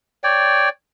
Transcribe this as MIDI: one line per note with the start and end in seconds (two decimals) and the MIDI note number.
0.24 0.69 73
0.24 0.69 74
0.24 0.69 79